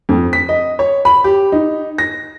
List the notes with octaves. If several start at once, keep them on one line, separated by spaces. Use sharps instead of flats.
F2
B6
D#5
C#5
B5
G4
D#4
A#6